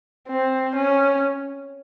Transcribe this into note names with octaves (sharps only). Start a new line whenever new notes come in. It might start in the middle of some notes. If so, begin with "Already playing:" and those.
C4
C#4